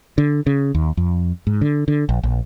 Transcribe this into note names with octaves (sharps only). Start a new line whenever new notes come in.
D3
C#3
D#2
F2
G#2
D3
D3
A#1
A#1